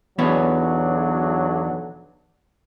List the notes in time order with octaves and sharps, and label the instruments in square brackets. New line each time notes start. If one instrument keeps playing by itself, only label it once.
[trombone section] B1 F#3 D4 [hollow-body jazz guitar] E2 B3 C#5